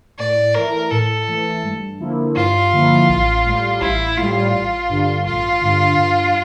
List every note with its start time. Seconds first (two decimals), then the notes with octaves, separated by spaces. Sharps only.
0.19 A2 D5
0.55 E3 A3 A#4
0.91 A2 A4
1.27 E3 A3
1.63 G2
2.00 D3 F3 A#3 E4
2.36 G2 F4
2.73 D3 F3 A#3 E4
3.09 A1
3.45 A2 G3
3.81 A1 E4
4.17 A2 G3 F4
4.53 A1
4.89 G2 D3
5.25 A1 F4
5.61 G2 D3
5.98 G2